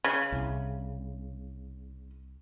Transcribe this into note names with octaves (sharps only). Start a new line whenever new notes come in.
C#3
C2